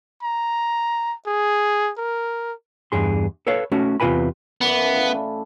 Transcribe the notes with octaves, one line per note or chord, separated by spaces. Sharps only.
A#5
G#4
A#4
E2 G2 G#4 C6
A4 B4 C#5 F5
A3 C#4 F#4
E2 C3 F4 B4 G#5 B5
F#2 E3 B3 D5
F3
A2 E4
C#4 D4